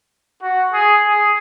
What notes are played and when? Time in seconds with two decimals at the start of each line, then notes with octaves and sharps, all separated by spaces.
0.42 F#4
0.73 G#4
1.04 G#4